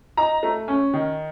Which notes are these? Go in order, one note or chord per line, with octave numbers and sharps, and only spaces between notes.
D#4 A#5
A3
C#4
D#3